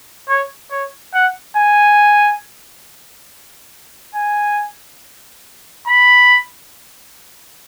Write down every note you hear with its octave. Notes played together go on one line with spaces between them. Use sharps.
C#5
C#5
F#5
G#5
G#5
B5